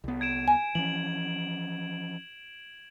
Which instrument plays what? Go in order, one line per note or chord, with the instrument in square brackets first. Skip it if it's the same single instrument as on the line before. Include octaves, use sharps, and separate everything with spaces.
[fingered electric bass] C2 B3
[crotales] G#6 D7 E7
[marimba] G#5
[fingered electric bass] E3 F3 C#4 [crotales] F#7